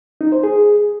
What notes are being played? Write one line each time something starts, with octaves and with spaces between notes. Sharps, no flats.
D#4
C5
G#4